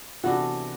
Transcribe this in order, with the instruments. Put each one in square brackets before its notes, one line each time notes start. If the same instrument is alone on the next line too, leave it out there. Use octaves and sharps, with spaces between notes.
[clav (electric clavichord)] C3 E3 B3 D4 A4 [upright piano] F#4